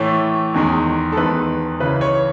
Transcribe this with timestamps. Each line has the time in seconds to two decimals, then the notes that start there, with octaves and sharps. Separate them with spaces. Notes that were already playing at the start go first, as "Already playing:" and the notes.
Already playing: A2 E3 A3 C#5
0.54 E2 D#3 G#3
1.12 A4
1.17 E2 D#3 G#3 B4
1.80 C#2 C#3 E3 B4
2.01 C#5